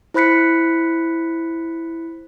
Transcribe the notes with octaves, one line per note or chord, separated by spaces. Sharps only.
E4 C5 B5 F#6 B6 C#7